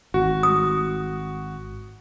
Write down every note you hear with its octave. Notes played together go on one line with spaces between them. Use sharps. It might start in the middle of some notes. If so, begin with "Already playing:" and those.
G#1 F#4
D#6